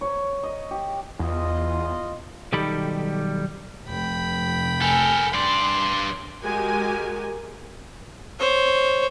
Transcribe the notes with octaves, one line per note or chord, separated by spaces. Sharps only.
C#5
D#5
G4
E2 F4 D#5
B1 D#3 G3 G4 A4 B5
F1 G5 B5
A4 A#4 G#5
G2 D5 C6
G#3 F#4 G4 A#4 G#5
C5 C#5